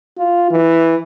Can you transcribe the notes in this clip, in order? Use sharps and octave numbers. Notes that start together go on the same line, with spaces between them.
F4
E3